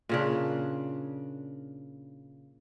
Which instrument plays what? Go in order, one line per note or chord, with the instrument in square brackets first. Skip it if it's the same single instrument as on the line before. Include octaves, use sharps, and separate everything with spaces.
[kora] A#2 C#3 D4